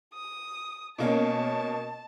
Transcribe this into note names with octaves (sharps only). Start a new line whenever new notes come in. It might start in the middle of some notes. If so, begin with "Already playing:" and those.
D#6
B2 A#3 C#4 A5